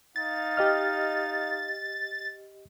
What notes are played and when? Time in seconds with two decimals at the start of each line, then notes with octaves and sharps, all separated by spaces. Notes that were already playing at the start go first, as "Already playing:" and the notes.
0.16 D#4 F5 A6
0.57 G4 D#5 F6